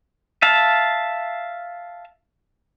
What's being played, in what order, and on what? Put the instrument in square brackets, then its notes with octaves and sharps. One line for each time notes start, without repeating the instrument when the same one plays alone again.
[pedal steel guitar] E5 F5 A5